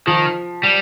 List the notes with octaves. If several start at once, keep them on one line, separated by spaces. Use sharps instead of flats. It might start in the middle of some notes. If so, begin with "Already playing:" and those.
D#3 F3
G3